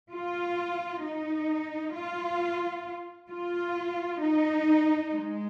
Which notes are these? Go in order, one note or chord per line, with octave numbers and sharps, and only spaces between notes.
F4
D#4
F4
F4
D#4
G#3